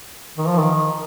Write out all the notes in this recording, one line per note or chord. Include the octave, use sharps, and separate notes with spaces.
D#3
F3
D#3